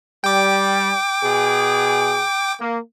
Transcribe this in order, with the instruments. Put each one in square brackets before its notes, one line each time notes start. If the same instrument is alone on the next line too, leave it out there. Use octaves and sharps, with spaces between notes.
[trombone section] G3 [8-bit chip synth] G5 D6
[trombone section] B2 G#4
A#3